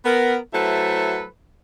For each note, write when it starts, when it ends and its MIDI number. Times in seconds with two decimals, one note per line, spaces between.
0.05 0.37 59
0.05 0.37 70
0.54 1.24 54
0.54 1.24 57
0.54 1.24 64
0.54 1.24 69
0.54 1.24 71
0.54 1.24 72